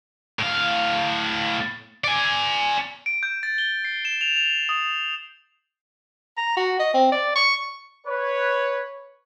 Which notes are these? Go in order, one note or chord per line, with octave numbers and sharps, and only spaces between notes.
A2 F5
D5 G#5
D7
G6
A6
G7
C7
E7
F7
F7
D#6
A#5
F#4
D#5
C4
D5
C#6
B4 C#5